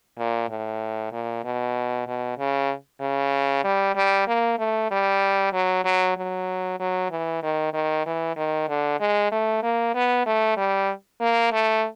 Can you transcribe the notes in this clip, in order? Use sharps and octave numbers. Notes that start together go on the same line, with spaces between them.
A#2
A2
A#2
B2
B2
C#3
C#3
G3
G3
A#3
A3
G3
F#3
F#3
F#3
F#3
E3
D#3
D#3
E3
D#3
D3
G#3
A3
A#3
B3
A3
G3
A#3
A3